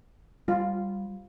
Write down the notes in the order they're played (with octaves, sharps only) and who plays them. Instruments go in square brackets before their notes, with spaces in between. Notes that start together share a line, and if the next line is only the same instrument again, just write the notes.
[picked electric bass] G3 [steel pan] F4